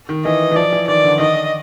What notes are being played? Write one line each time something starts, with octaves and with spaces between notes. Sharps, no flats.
D#3
E3 D#5
E3
F3 D5
E3
D#3 D5
D3
D#3 D#5